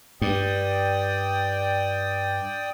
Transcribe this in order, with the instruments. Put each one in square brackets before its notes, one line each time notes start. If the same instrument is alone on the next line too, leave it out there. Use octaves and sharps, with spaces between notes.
[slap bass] G2 [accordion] D5 G5 D#6